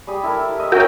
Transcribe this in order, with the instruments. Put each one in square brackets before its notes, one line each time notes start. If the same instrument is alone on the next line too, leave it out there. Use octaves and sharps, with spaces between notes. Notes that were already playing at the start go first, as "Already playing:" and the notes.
[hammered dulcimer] G3 G4 G#4
E4 A4 A#4
E4
D#5 E5
[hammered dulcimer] C#4 G#4 D#5 [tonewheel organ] F#4 A#4 G5